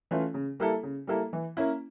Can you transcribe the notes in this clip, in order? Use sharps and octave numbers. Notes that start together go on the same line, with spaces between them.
E3 A3 C#4 F4
C#3
G3 A#3 E4 A4
C#3
G3 A#3 E4 A4
E3
A#3 C#4 E4